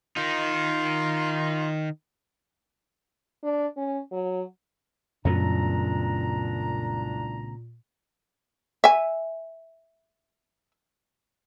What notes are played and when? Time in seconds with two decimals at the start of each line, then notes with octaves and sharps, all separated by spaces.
0.16 D#3 D#4 F4
3.43 D4
3.77 C#4
4.12 F#3
5.25 C2 F#2 A#2 C#3 A3 B3 D4 A#5
8.84 E5 G#5